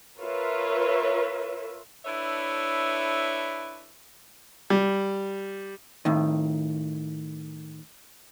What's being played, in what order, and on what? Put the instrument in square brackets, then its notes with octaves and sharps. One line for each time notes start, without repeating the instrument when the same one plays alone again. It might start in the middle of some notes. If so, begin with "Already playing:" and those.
[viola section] F4 A#4 B4 C#5 E5
[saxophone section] D4 E4 A4 B4 C#5 E5
[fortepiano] G3
[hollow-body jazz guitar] A2 D#3